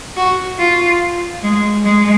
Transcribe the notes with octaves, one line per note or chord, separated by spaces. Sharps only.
F#4
F4
G#3
G#3